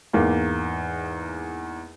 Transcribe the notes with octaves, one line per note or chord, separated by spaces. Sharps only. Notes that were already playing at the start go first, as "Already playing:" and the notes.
E2 G#2 A#3